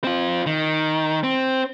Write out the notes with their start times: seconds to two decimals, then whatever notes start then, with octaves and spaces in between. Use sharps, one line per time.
0.04 C4 F4
0.46 D#3
1.24 C4